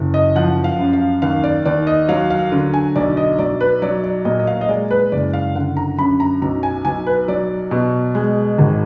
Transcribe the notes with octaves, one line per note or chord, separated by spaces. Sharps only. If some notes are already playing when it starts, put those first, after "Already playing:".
Already playing: F#1
D#5
F3 F#5
F5
F#2
F5
D#2 F5
D5
D#2 D5
D#5
F#3 F5
F5
D3
G#5
B1 D5
D#5
B1 D5
B4
F#3 D5
D5
A#2 D#5
D#5
F5
D#5
G#3 D5
B4
F#1 D5
F5
D3 F#5
A#5
F#2 B5
A#5
B1 A#5
G#5
B1 G#5
B4
F#3 D5
B2
G#3
G#1